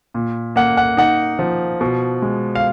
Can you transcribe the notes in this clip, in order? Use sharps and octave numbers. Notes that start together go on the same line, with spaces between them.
A#2
A#3 F#5
F#5
D#4 F#5
F3
B2
G#3
F5